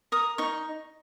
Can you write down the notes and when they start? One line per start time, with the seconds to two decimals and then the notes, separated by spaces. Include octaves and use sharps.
0.12 A#4 D#6
0.38 D#4 C#6